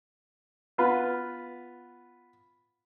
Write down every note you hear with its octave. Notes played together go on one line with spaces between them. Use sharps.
B3 F4 B4